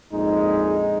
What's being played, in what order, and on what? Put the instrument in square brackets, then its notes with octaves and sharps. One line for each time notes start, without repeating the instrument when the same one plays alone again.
[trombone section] A#1 F2 G#3 D#4